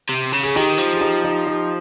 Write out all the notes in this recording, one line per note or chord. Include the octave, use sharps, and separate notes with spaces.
C3
C#3
G#4
D#3 D#4 G4
F3
G#4
D#4 G4
D#4 G4
D#4 G4